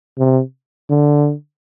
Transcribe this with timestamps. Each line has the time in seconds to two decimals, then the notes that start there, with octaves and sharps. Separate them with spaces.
0.18 C3
0.90 D3